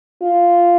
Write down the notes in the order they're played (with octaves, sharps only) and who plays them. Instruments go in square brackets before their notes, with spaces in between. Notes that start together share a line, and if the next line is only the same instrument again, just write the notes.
[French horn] F4